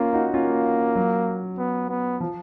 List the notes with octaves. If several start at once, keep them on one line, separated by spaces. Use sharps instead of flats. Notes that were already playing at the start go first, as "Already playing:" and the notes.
Already playing: A#3 C#4 F4
D#4 F#4
A#3 C#4 F4
F#3
B3
B3
F3